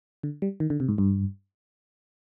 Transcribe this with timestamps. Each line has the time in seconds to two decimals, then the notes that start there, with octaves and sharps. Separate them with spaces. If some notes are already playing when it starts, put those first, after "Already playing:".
0.23 D3
0.42 G3
0.60 D#3
0.70 D3
0.80 C3
0.88 G#2
0.98 G2